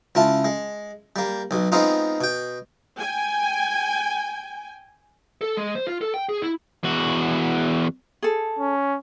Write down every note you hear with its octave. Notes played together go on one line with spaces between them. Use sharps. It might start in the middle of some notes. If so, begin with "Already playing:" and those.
C#2 E4 F4 A5
G#3
G3 A#3
B1 B2
G#3 B3 C4 D#4 F4
B2 G5
G5 G#5
A4
G#3
C5
F4
A4
G5
G#4
E4
E2 F#4
G#4 A4
C#4